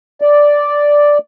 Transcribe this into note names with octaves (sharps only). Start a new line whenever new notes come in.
D5